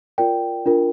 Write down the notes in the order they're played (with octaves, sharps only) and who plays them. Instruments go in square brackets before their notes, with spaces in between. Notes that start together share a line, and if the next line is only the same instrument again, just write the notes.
[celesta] F4 A#4 D5 G5
D4 F4 A#4